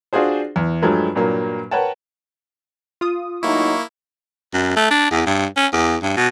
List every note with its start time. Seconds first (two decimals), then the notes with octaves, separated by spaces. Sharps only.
0.13 D4 F4 F#4 G#4 C5
0.56 E2
0.82 G2 F3 F#3 G#3 A3
1.15 G2 A#2 F#3 A#3
1.71 A#4 B4 C#5 F#5 G5 A5
3.01 F4 D#6
3.43 A2 F#3 A#3 D#4 E4 C#6
4.54 F#2
4.76 A3
4.90 D4
5.11 E2
5.26 G2
5.56 C#4
5.73 E2
6.02 G2
6.16 B2